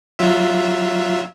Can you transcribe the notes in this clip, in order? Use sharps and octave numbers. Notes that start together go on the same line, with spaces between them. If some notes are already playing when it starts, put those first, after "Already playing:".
F#3 F4 E5